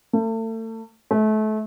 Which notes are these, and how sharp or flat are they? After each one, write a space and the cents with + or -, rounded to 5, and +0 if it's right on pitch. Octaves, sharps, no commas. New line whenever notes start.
A3 +35
A3 -30